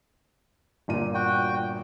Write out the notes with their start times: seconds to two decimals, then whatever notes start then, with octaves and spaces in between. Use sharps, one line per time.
0.88 G1 A#2 D#7
1.14 F#4 G5